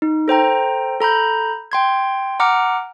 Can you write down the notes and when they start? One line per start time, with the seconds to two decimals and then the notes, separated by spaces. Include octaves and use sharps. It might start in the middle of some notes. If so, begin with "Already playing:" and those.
0.02 D#4
0.28 A4 C5 G5 A#5
1.00 A4 A#5 B5 G6
1.72 G5 C6 G#6
2.40 F#5 A#5 D6 F6 C#7